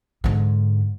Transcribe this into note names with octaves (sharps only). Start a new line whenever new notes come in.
G#2 D3